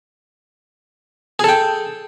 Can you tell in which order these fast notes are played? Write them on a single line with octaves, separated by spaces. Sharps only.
G#4 A4 G5